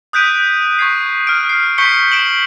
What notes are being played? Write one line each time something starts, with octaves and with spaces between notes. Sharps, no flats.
D#6 F#6 G6 B6 D7 D#7
C#6 G#6 C7
F6 D7
C7
C#6 G6 B6 C#7 G7
C#7 D7 E7 F#7